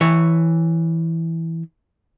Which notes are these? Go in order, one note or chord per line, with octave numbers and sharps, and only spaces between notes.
E3 C#5